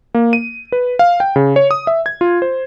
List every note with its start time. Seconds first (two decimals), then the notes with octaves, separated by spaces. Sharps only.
0.14 A#3
0.33 D#7
0.72 B4
0.99 F5
1.20 G5
1.36 C#3
1.56 C#5
1.71 D#6
1.87 E5
2.06 G#6
2.21 F4
2.42 C5